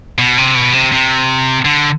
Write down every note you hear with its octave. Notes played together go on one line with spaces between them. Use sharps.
B2
C3
B2
C3
C3
D3